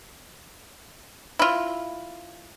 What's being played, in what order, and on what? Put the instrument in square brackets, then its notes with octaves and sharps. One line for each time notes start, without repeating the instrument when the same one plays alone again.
[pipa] E4 F4